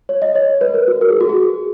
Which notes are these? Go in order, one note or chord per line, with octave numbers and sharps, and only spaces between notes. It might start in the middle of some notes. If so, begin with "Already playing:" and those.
C#5
D#5
C#5
B4
A#4
F#4
A#4
G#4
F#4
G#4